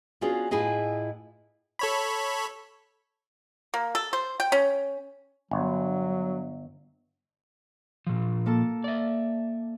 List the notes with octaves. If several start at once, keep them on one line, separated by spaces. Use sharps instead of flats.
B3 C#4 D4 F4 F#4 G#4
A2 E4 F4 G#4 D#5 G#5
A4 C#5 B5
A#3
A4
C5
G5
C#4
G1 F#3
A#2 F3
A#3 A4 A5
D5 E5